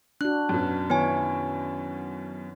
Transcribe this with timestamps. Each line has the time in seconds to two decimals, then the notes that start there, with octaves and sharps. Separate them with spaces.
0.21 D4 F#4 F#6
0.49 F#2 B2
0.90 D#3 B3 E4 C#5 G#5